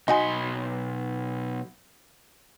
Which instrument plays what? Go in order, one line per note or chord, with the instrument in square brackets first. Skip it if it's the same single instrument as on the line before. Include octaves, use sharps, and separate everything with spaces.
[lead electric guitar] B1 C6 [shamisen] D#4 F#4 G#5